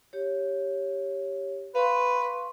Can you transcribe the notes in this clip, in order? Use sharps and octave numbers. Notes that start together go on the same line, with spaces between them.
G4 C#5
B4 F5 C6 C#6